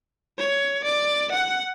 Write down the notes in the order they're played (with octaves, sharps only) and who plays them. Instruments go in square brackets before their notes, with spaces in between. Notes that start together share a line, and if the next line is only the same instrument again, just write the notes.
[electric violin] C#5
D5
F#5